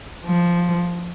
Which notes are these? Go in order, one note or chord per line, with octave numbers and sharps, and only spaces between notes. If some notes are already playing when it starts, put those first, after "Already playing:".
F3